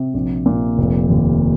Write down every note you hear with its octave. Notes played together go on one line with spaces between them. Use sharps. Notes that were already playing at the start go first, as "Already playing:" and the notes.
Already playing: C3
A#1
A#2
F1
D#2